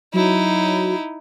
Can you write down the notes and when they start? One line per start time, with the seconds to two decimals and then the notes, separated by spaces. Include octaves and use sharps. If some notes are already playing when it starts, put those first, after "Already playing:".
0.14 F#3 D#4 E4